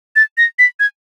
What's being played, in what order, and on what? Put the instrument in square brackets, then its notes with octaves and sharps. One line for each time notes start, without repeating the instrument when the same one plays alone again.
[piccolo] A6
A#6
B6
G#6